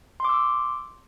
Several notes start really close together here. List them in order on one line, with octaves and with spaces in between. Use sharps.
C6 D6 E6